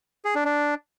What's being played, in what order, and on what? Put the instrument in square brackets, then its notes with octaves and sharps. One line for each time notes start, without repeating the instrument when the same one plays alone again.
[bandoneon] G#4
D4
D4